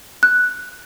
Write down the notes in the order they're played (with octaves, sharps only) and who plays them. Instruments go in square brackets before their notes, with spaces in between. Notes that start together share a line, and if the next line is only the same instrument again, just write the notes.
[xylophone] F#6